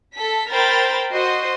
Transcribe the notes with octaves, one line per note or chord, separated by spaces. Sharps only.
A4 B6
A#4 C5 G5 B5 A6
F#4 C5 D#5 C6